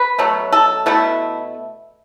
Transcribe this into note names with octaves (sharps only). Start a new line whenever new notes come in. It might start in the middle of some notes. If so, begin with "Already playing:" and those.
Already playing: B4
B2 F#3 A3
A4
B2 A3 E4